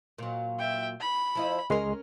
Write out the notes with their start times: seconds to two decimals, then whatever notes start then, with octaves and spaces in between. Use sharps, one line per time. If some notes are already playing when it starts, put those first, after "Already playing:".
0.18 A#2 F#3
0.59 E5 G5
1.00 B5
1.35 F3 E4 D#5
1.70 C#2 G#3 C#4 A#4 C6